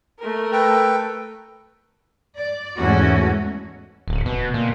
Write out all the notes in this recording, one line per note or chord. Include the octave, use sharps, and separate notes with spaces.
A3 A#4
A4 B4 G5
D5
E2 G#2 A3 C#4 F#4
D1
B2
A#2